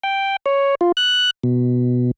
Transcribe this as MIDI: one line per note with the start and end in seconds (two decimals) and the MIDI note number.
0.03 0.36 79
0.46 0.75 73
0.81 0.92 65
0.97 1.30 90
1.43 2.11 47